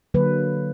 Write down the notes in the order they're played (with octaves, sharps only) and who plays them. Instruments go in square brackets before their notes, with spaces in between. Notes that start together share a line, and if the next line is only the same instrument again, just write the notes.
[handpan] D3 F#3 A#3 B4